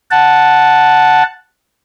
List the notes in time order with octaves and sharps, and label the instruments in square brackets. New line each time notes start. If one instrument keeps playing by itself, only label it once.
[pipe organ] F#5 A5